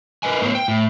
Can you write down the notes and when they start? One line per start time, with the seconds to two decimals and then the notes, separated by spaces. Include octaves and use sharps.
0.23 A#4 B4 D#5 G#5
0.41 A2 F#3 B3 G#4 C5 C#5
0.55 G5
0.68 A2